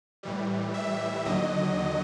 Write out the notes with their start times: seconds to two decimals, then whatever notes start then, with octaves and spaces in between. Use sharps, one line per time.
0.23 A2 E3 G3
0.74 E5
1.25 D#2 D3 F#3 D#5